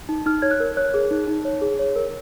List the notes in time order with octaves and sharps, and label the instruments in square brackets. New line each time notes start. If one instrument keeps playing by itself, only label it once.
[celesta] D#4
D#4 F6
C#5 G#6
F#6
A#4
C#5 F#6
G#4
D#4
D#4
C#5
G#4
C#5
A#4